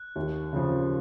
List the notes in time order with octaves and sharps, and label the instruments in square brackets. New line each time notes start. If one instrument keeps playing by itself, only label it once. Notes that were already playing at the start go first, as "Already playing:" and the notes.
Already playing: [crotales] F#6
[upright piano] D#2
C#3 F3